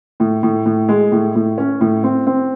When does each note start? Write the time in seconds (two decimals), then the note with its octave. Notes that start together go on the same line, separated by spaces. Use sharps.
0.20 A2
0.43 A2
0.66 A2
0.89 G#3
1.12 A2
1.35 A2
1.58 C#4
1.81 A2
2.04 C4
2.27 C4